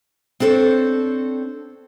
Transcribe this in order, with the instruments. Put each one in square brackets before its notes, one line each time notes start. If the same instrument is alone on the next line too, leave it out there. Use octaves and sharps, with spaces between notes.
[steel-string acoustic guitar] C4 D4 A4 C5 C#5